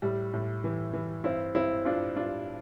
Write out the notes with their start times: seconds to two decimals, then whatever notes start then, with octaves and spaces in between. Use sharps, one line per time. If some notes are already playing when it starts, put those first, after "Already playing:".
0.02 A2 G3
0.33 A2
0.64 E3
0.93 E3
1.24 G2 C4 E4
1.55 G2 C4 E4
1.85 G2 D4 F4
2.16 G2 D4 F4